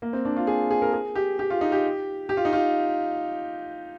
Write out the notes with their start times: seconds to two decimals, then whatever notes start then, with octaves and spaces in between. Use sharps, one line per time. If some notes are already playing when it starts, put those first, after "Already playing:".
0.02 A#3
0.13 C4
0.25 D4
0.37 F4
0.47 G#4
0.71 G#4
0.82 A#4
0.93 G#4
1.15 G4
1.39 G4
1.50 F4
1.61 D#4
1.72 G4
2.29 G4
2.37 F4
2.45 D#4
2.53 F4